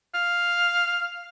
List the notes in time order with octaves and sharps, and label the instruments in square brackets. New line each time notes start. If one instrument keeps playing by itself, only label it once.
[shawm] F5